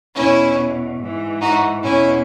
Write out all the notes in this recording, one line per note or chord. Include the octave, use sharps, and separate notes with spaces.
E2 B2 C#4 E4
G#2 E3
D#4 F#4
E2 B2 C#4 E4